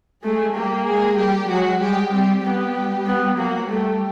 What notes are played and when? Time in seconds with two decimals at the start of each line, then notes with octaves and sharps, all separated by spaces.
0.24 G#3 A3 G#4
0.55 G3 A#3 G4
0.86 G#3 G#4
1.18 G3 G4
1.49 F#3 G#3 F#4
1.81 G3 G#3 G4
2.12 G3 C4 G4
2.43 G3 B3 G4
3.07 B3
3.38 F#3 A#3 F#4
3.69 G3 A3 G4